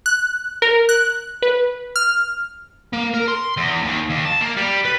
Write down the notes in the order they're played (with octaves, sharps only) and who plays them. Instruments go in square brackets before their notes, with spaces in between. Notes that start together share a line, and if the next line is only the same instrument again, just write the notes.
[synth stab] F#6
A#4
F#6
B4
F6
[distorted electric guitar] A#3
A#4
C6
E2
D#2
D#2
A5
A#3
G3
B4